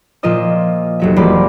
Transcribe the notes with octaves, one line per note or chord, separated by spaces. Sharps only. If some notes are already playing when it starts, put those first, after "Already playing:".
A#2 F3 A#3 F4 D#5 E6
F1 F#3 E5
E1 F3 G3 A#3 D5 B5